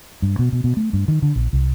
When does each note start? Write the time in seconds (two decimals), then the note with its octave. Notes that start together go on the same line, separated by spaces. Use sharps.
0.22 G2
0.39 B2
0.52 B2
0.64 B2
0.77 A3
0.93 G2
1.08 D#3
1.22 D3
1.36 A#1
1.53 C2